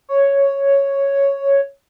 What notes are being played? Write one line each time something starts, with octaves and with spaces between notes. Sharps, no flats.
C#5